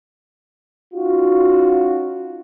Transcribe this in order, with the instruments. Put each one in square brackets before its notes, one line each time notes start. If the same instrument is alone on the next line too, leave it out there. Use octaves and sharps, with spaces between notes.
[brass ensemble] C#4 D#4 F4 F#4